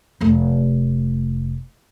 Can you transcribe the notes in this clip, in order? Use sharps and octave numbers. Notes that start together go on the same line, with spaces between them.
F1 A3